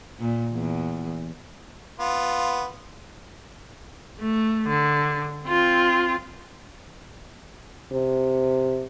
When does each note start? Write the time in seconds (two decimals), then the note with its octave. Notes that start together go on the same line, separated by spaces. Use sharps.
0.20 A#2
0.54 E2
2.00 B3 F4
4.20 A3
4.68 D3
5.47 C4 F4
7.92 C3